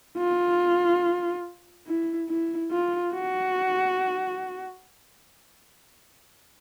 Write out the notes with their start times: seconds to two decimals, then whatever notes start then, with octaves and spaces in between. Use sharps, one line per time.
0.17 F4
1.86 E4
2.28 E4
2.71 F4
3.14 F#4